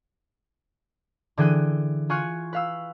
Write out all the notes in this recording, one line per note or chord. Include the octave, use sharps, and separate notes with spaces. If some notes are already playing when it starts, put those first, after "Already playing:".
D3 E3 G#4 G5 F#6 D#7
F4 G#5 C#6 F6 F#6
B4 F5 E6